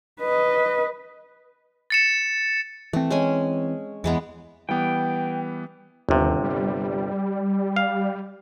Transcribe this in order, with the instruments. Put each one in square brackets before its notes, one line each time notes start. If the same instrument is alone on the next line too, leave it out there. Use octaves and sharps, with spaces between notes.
[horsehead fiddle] B4 D#5
[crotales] A6 C#7 E7
[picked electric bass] E3 C4 [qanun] A3
[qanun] G#3 C#4 G#5
[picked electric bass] E2 [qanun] E3 G#3 B3
[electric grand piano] E3 G3 B3 [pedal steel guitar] G5
[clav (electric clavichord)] G1 C3 [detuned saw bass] D#2
[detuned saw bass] G3
[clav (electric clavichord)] F5